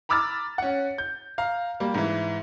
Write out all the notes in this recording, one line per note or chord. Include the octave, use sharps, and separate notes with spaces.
A#5 B5 D6 E6 F6 A6
C#4 F#5
G6
F5 A#5
G3 A#3
G#2 E3